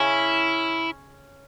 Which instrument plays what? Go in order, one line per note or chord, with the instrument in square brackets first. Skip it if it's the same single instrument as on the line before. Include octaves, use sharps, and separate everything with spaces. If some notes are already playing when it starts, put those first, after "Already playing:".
Already playing: [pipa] C#3 C#4 [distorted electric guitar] E4